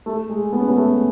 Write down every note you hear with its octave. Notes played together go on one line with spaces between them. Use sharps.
A3
G#3
B3
C#4
B3
A3